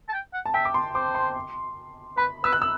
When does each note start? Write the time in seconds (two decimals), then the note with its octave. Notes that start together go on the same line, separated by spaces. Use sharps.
0.08 A5
0.13 G5
0.33 F#5
0.46 A5
0.54 E5 G5
0.65 D6
0.74 C6
0.95 C5 D6
1.15 C6
2.17 B4 B5
2.44 B4 E6
2.53 F#6
2.62 E6